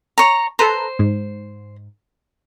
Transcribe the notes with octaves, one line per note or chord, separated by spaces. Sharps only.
C#5 A#5
A4 B4 C5 A#5
G#2